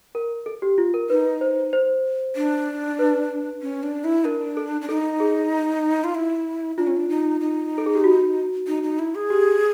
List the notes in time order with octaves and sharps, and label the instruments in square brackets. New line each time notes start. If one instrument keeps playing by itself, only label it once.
[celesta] A#4
A4
G4
F4
A#4
[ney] D#4 [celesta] B4
[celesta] C5
C5
[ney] D4
[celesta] B4
[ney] C#4
D4
E4
[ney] D4 [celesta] A#4
[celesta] A4
[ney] D4
[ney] D#4 [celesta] A4
[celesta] G#4
[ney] F4
E4
[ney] D4 [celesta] F4
[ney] C#4
D4
D#4
D#4
[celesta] A4
G#4
G4
F#4
[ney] D#4
D#4
E4
G#4
[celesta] G4